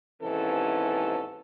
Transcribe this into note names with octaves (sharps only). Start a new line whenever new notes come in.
D#2 G#2 C3 E3 C#4 A4